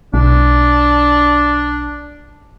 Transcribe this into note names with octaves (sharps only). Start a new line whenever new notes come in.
B1 D4